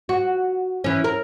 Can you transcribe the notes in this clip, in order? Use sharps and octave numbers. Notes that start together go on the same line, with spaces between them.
F#4
E3 C#4
A#4